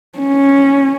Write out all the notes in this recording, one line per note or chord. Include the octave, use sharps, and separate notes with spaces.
C#4